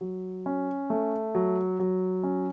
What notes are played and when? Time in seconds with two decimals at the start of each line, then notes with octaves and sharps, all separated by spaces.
0.01 F#3
0.46 C#4
0.90 A3
1.35 F#3
1.80 F#3
2.23 C#4